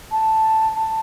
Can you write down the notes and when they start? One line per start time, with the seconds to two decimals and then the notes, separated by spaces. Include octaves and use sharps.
0.12 A5
0.74 A5